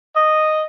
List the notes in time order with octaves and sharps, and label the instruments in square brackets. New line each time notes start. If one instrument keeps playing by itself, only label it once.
[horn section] D#5